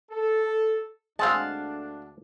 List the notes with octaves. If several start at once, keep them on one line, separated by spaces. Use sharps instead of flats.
A4
D2 D3 G#3 C4 D4 F5 F#5 A5